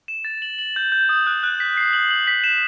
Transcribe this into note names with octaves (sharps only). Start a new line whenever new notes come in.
E7
A6
F#7
F#7
G6
G6
D#6
F#6
F#6
B6
C7
F#7
F#7
B6
E7